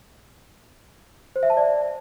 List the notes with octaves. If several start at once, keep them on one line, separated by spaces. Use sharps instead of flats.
C5
E5
A5
D5